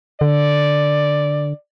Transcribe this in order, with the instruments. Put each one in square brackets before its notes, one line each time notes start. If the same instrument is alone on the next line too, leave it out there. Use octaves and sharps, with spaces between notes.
[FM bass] D3 [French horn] D5